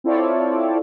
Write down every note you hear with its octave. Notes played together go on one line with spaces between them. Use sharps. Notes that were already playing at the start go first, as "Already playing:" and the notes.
C4 E4 F4 A4 C#5 D5